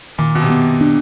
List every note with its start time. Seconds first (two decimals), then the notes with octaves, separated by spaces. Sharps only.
0.18 A#2 D#3
0.35 B2
0.42 C3
0.50 B3
0.81 D4